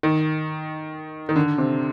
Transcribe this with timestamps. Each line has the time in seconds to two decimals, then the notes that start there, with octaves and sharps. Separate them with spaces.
0.03 D#3
1.29 D#3
1.36 D3
1.58 C3